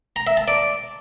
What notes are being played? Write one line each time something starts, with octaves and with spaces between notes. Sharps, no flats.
A#5
E5
A5
D5